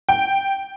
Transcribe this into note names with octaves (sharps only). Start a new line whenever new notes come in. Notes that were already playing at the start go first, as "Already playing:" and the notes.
G5